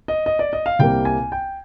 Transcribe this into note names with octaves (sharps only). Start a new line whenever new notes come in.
D#5
D#5
D5
D#5
F5
C2 C3 G3 A#3 G5
G#5
G5